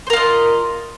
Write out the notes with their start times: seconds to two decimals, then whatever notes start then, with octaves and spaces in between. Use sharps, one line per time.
0.07 C5
0.10 A#4
0.13 F4
0.16 D#5